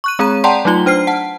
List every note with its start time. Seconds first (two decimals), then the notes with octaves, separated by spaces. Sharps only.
0.04 C#6 F#6 D#7
0.19 G#3 C4 G#4 C#5 A#5 D#7
0.44 D5 F#5 G5 A5 A#5 C6
0.65 F#3 A3 D#4 F4 G7
0.86 D4 C5 F6 C7
1.07 F#5 A5